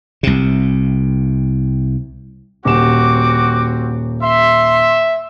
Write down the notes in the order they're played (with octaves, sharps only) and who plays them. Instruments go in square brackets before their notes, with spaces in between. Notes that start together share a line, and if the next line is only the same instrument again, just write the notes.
[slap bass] C2 C3
[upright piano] D#1 E7 [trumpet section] C4 F#4 [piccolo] D6
[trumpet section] E5 [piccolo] C6